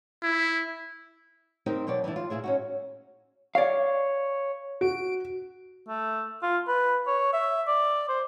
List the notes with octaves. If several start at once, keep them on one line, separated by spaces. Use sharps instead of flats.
E4
C4 D#4 G4 A#4
B2 F#3 C#5 D5
E3 G3 D4 E4
F4
A#2 E4 G#4 E5
C#4 D#4 F#4
C#5 D5 F5
F#4 D7
A3
F4
B4
C#5
E5
D5
C5